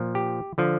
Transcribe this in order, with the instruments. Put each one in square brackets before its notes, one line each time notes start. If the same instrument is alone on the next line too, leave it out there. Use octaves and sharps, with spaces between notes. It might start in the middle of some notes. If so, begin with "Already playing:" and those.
Already playing: [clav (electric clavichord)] A#2 F3
G4
D3 F3